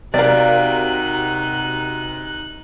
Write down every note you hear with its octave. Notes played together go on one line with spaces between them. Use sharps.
C3 D#4 F#4 A#4 D5 F5 F#6